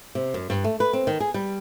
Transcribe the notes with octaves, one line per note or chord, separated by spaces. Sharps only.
C3
F#2
G2
A3
B4
C4
D#3
G#4
G3